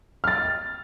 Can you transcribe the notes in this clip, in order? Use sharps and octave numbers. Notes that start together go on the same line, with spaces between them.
F6 A6